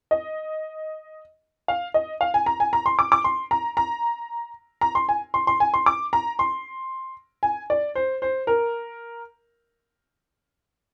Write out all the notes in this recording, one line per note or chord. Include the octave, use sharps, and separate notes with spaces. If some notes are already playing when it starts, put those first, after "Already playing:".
D#5
F5
D#5
F5
G#5
A#5
G#5
A#5
C6
D6
D6
C6
A#5
A#5
A#5
C6
G#5
C6
C6
G#5
C6
D6
A#5
C6
G#5
D5
C5
C5
A#4